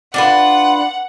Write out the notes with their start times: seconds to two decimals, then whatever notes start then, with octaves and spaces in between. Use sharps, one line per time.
0.14 D4 F4 B4 F#5